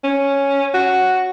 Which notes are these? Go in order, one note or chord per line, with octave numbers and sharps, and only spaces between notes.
C#4
F#4